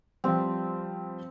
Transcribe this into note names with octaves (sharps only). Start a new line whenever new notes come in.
F3 G3 C4